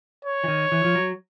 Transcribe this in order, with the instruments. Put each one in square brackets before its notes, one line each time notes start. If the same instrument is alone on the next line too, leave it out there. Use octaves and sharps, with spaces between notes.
[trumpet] C#5
[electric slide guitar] E3
D#3
E3
F3
F#3